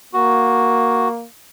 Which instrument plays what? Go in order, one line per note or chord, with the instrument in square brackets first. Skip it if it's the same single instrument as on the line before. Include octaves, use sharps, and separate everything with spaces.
[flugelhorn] A#3 [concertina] F#4